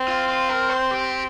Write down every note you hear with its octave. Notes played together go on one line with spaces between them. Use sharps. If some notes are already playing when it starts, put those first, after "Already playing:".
Already playing: C4
F4
F4
A#4
C5
G4